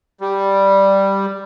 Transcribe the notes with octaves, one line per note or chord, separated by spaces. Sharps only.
G3